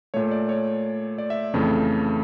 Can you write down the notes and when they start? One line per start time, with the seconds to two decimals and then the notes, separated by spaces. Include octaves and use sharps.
0.14 A#2 A3 C#5
0.31 D5
0.49 C#5
1.18 D5
1.30 E5
1.54 F2 C#3 E3 A3